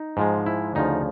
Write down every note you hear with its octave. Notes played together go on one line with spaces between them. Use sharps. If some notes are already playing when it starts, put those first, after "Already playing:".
Already playing: D#4
G#2 F3 G#3
E4
D2 C#3 F3 D#4